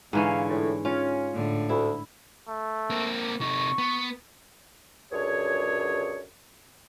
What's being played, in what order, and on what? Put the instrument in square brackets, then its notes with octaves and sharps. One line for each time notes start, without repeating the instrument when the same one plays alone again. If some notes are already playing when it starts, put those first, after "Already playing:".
[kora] G#2 E3 C#4 [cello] D3 [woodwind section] F5 G#5
[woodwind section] A2
[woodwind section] C#4 [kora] F4
[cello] A2 D3
[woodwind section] D2 [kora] E4
[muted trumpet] A3
[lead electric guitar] A#3 C4
[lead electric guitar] C3 D#4 [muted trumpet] C#6
[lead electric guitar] B3
[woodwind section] C#2 F#2 D3 G#4 C#5